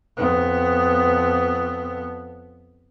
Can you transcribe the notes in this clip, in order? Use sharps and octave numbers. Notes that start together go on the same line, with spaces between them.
F2 B3